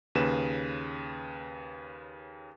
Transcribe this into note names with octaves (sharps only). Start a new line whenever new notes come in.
D#2 C#3 B4 E7